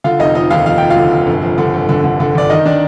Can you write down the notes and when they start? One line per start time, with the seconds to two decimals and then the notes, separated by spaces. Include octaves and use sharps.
0.04 D3 F4 F5
0.19 F1 D#4 D#5
0.35 F3 D#4 D#5
0.51 D#2 F4 F5
0.66 F3 F5
0.78 F3 G5
0.90 F4 F5
0.97 D3
1.12 F1
1.27 G1
1.42 F3
1.58 D3
1.74 G1
1.89 D3
2.04 D3
2.20 D3
2.35 G1 D5
2.50 D#3 D#4 D#5
2.66 D#3 D4 D5